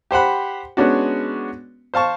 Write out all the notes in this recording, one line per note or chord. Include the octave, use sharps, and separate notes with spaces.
G4 C5 F#5 B5
G#3 B3 C#4 D4 F#4
C5 F5 A5 C#6